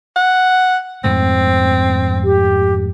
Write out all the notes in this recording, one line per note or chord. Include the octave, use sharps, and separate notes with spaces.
F#5
F2 G#2 A3 C4
G4